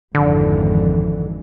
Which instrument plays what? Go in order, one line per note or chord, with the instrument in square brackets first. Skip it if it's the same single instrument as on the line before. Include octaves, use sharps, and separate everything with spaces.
[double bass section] G#1 F2 E3 [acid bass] D3